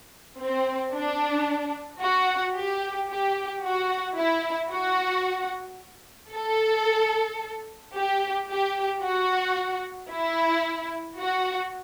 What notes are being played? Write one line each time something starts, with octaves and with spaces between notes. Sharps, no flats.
C4
D4
F#4
G4
G4
F#4
E4
F#4
A4
G4
G4
F#4
E4
F#4